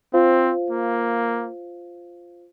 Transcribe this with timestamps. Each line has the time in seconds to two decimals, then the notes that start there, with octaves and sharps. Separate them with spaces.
0.13 C4 F4 C5 F5
0.70 A#3